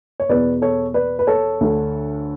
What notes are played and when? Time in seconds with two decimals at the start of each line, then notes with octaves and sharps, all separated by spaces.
0.20 C#5
0.29 E2 B2 B4 D5
0.62 A4 C#5
0.94 B4 D5
1.19 B4
1.27 A4 C#5
1.61 D2 D3